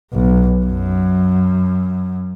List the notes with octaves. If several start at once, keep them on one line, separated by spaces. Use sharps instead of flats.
B1
F#2